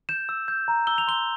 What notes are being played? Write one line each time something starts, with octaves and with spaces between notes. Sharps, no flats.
G6 E7
E6
G6
A#5
E6 G7
F7
C6 G7